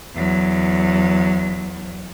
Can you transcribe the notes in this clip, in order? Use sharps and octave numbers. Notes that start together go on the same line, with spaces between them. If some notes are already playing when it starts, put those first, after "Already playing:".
E2 F#3